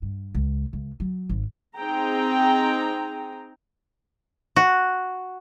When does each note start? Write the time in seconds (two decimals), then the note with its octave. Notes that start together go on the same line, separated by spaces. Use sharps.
0.02 G2
0.34 C#2
0.73 C#2
1.00 F#3
1.29 G#1
1.77 C4 D#4 G#4 G5 A#5
4.56 F#4